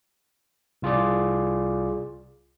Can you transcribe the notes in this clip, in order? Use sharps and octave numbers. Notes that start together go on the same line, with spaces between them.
C2 F4 G#4 D5